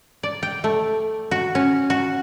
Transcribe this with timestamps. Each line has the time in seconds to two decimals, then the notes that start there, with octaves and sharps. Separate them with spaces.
0.23 D5
0.43 G5
0.64 A3
1.31 F#4
1.55 C#4
1.90 F#4